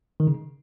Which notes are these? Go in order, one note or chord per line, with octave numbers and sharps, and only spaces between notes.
D#3
C#3